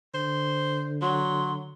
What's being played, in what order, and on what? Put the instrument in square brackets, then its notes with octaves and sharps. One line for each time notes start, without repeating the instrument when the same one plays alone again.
[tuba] D3 [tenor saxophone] C5
[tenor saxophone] F#3 [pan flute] C6